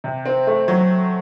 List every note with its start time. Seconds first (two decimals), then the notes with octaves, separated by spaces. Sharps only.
0.04 C3
0.25 C4
0.47 A3
0.68 F#3